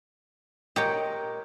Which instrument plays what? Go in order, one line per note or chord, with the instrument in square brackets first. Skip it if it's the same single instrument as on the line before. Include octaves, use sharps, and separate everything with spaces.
[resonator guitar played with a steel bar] A#2 A#4 D#5 [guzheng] G4 C#5 G5